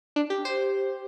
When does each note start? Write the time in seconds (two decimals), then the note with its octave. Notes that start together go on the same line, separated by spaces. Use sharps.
0.16 D4
0.30 G4
0.45 C5